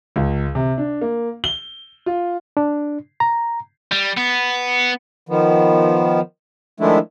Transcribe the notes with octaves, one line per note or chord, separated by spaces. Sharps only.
C#2
C3
D4
A#3
G7
F4
D4
A#5
G3
B3
D#3 F3 B3
D#3 F3 G#3 A3 D4 E4